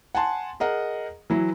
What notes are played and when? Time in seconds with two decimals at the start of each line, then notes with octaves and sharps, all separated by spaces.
0.15 F#5 G#5 A5 C6
0.60 G#4 A#4 D#5 F#5
1.30 E3 F#3 E4